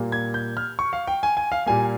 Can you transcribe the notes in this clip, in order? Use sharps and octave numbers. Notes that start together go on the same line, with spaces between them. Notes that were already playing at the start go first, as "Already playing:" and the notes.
Already playing: A#2 G3 A#3
G#6
G6
F6
C#6
F5
G5
G#5
G#5
F5
A#2 G3 A#3 G#5